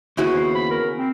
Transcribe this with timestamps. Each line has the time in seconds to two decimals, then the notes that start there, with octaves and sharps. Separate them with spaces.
0.17 D#2 C#3 B3 E4 F#4
0.32 C5
0.55 B5
0.70 A#4
0.98 C4